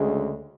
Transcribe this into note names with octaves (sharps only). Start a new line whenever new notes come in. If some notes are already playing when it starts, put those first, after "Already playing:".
Already playing: D2 C#3 G#3